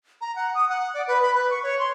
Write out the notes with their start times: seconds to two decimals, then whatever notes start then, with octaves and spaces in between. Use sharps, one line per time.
0.21 A#5
0.36 F#5
0.55 D#6
0.69 F#5
0.94 D5
1.08 B4
1.22 B5
1.35 B4
1.51 C#6
1.63 C#5
1.79 C6